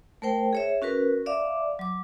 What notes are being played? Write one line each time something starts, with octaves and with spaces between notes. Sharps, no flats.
A3 A#4 C5 G5
G#4 C#5 E5
C#4 F#4 A#4 B4
D5 E5 F5 D6
F#3 D6